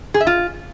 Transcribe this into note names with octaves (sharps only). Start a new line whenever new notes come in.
G#4
E5
F4